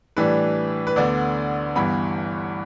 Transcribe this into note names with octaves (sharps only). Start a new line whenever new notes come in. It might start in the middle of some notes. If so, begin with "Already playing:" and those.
A2 E3 G3 D4 B4
B4
D2 D3 B3 D5
G1 G2 E3 B3 B5